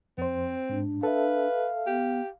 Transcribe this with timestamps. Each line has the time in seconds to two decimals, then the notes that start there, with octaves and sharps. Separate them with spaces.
0.18 F2 C4 C5
0.70 G#2 D4
1.03 A4 B4 E5 F5
1.87 B3 G4